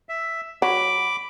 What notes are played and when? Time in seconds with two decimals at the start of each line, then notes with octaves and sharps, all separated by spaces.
0.09 E5
0.62 F#3 B5 D6